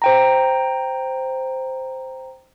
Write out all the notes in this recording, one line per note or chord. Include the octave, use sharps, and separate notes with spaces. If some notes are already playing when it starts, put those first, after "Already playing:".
C5 G5 A#5